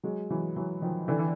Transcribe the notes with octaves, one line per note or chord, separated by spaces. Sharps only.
F#3 G#3
E3 F#3
E3 F#3
D#3 F3
D3 E3
E3